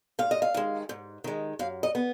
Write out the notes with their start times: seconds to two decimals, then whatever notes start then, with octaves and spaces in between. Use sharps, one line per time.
0.19 G#2 F5
0.31 D#5
0.42 F5
0.54 D#3 G#3
0.89 G#2
1.24 D#3 G#3
1.59 F#2 F5
1.83 D#5
1.95 B3